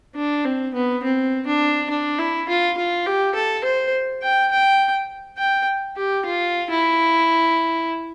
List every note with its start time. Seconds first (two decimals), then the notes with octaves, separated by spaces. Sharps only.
0.15 D4
0.44 C4
0.74 B3
1.04 C4
1.46 D4
1.90 D4
2.19 E4
2.49 F4
2.77 F4
3.06 G4
3.35 A4
3.64 C5
4.23 G5
4.52 G5
5.38 G5
5.97 G4
6.25 F4
6.70 E4